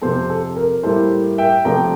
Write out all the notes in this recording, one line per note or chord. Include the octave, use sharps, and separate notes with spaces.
F2 C3 F3 A4 C5
A4
A#4
A2 G3 A#3 E4 A4 C5
E5 G5
C3 F3 A3 D4 G5 A#5